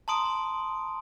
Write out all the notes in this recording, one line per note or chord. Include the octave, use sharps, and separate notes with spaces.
A5 A#5 C6 D#6 D7